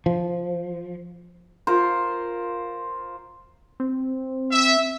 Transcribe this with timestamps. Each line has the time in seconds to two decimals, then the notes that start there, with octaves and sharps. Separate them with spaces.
0.06 F3
1.67 F4 A#4 C5
3.80 C4
4.51 E5